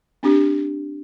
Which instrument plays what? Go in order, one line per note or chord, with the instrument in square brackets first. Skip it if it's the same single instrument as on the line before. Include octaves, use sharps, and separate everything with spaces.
[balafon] C4 D4 G4